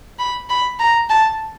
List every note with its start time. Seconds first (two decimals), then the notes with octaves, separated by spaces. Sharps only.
0.19 B5
0.49 B5
0.79 A#5
1.10 A5